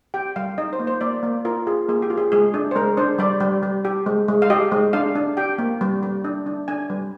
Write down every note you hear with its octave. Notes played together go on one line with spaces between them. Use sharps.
G4 G5
G3 F5
D#4 D#5
C5
A#3
C5
A#3 D5
A#3
F4 A#4
F4 G#4
A#3 G#4
G4
F4
G#4
G#3 G#4
D4
C5
G#3 A#4
D4 C5
G3 D5
G3
G3
G4
G#3
G#3
F5
G4 D#5
G#3
D4 F5
D4
G4 G5
A#3
G3
G3
D4
D4
D4 G#5
G3